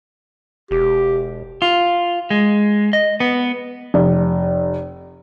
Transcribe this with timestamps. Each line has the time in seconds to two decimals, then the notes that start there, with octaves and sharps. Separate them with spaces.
0.71 E1 G4
1.62 F4
2.30 G#3
2.93 D#5
3.20 B3
3.94 F1